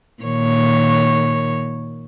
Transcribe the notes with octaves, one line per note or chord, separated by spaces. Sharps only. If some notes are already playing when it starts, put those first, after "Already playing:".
A#2 D#3 C#5